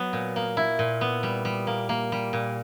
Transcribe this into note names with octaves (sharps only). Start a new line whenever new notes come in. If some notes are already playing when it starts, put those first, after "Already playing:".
Already playing: F#3 B3
A#2
A#3
E4
A#2
B3
G3
G3
A#3
A#3
G3
A#2